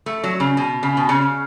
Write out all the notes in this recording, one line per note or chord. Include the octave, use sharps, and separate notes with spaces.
A3
F#3
C#3
B2
C#3
B2
C#3